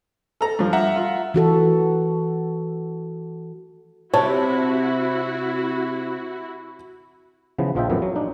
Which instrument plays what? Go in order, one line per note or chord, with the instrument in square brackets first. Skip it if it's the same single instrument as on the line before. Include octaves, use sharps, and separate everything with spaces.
[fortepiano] A4 A#5
G2 F3
[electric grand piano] E5 F#5 A#5
[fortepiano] F4
[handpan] E3 F#4 A4
[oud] C3 [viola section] E4 F#4 [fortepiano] C#5 A5
[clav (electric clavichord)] C#3 E3 F3 B3
A#1 F3 F4 D#5 E5 G5
F#2 A2 E3 F3 A#3 B3
F#3
D4 D#4